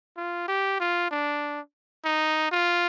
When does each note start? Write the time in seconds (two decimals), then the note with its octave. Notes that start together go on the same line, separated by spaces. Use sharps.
0.17 F4
0.48 G4
0.80 F4
1.11 D4
2.05 D#4
2.52 F4